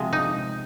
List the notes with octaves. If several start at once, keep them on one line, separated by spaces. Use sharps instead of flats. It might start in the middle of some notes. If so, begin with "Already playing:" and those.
Already playing: C3 F3 G#3
D#4